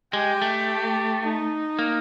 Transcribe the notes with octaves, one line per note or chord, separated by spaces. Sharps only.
G#3 G4
A3
D#4
A#3